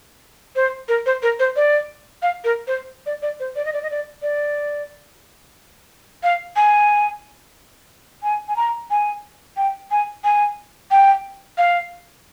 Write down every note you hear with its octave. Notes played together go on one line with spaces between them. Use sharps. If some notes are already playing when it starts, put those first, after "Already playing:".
C5
A#4
C5
A#4
C5
D5
F5
A#4
C5
D5
D5
C5
D5
D#5
D5
D#5
D5
D5
F5
G#5
G#5
G#5
A#5
G#5
G5
G#5
G#5
G5
F5